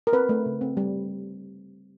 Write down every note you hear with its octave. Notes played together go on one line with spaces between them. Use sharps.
A#4
C4 B4
A3
C#3
C4
G3